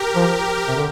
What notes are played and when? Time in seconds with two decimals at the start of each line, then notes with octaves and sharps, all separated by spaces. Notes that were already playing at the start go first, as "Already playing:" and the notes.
Already playing: G4 A#4
0.15 F3
0.68 C3
0.76 D3